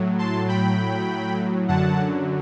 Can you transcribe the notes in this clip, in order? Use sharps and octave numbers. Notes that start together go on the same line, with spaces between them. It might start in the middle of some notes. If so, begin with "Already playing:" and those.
Already playing: A2 F#3
A5 C6
G5 B5
F#2 D3 F#3 F#5 A5